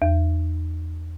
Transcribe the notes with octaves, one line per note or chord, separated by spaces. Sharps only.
E2